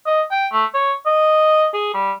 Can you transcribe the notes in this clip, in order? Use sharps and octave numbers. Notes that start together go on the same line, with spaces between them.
D#5
G5
A3
C#5
D#5
G#4
G3